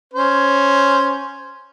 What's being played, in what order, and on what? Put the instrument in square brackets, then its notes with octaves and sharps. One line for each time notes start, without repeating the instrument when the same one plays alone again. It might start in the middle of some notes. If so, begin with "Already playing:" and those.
[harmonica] C#4 C5